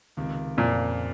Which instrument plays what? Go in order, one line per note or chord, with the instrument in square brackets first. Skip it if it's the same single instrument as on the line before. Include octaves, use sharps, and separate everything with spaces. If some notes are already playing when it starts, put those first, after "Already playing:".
[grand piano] C#2 C3 D#3
[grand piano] F2 C#3 F3 A#3 [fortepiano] A#2